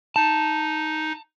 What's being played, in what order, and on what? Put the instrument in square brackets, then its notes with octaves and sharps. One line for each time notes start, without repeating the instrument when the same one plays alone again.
[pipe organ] D#4 [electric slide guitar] A5